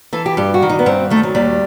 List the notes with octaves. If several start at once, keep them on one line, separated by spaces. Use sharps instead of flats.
E3 A4
G4
G2 G4
F#4
D#3
D#4
B3
G2 C4
D#3 A3
F#3
D#2 G3